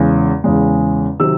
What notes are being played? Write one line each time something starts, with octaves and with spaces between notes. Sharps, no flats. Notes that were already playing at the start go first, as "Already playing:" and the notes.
Already playing: E2 C#3 G#3
E2 C#3 G#3
C3 D#3 F#3 C4 E6